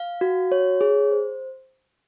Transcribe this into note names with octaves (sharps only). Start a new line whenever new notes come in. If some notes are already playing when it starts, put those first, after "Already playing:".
Already playing: F5
F#4
C#5
G#4
C5